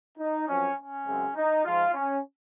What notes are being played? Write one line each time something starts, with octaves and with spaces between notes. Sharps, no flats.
D#4
F#2 F3 C4 C#4
C#4
F#2 C#3 G#3 C4
D#4
G#2 F3 G#3 F4
C#4